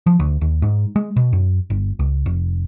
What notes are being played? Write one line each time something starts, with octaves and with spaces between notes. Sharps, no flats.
F3
D2
D#2
G#2
G#3
B2
F#2
G1
C#2
F1